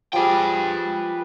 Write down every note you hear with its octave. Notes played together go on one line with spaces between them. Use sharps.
F3 G3 G#4 B4 G5